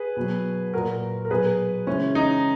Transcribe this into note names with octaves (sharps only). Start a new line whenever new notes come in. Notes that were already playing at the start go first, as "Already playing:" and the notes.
Already playing: G#4 B4
B2 F#3
A#2 F#3 F#4 A#4
A#4
B2 F#3 G#4 B4
C#3 E3 G#3 C#4
D#4